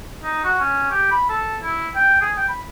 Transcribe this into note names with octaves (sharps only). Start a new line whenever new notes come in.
D#4
F#4
C#4
G4
B5
A4
E4
G5
G#4
G5
B5